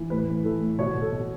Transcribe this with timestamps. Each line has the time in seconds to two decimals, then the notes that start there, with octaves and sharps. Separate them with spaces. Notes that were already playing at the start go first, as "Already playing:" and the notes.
Already playing: E3
0.10 A2 B4
0.28 E3
0.44 E3 A4
0.61 A2
0.79 B2 C#5
0.94 B2
1.01 A4
1.12 B2